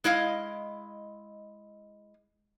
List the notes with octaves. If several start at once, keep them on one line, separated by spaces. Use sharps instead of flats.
G#3 E4 D#5 F5